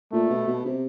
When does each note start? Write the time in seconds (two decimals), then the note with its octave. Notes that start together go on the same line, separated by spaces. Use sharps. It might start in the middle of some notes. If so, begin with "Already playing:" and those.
0.12 A#2 A3
0.30 B2
0.47 B2
0.65 C3